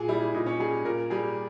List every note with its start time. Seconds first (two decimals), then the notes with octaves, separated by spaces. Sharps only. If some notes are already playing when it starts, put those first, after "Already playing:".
Already playing: A#2 G#4
0.08 G3 E4
0.34 A#2 D#4
0.46 C#4
0.59 G3 G#4
0.85 A#2 A#4
1.10 G3 G#4